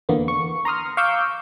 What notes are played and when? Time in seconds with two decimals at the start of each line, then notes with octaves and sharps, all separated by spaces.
0.09 E2 D3 A#3 B3
0.28 C#6
0.65 A#5 C6 D#6 F6
0.97 F5 C#6 D6 E6 G6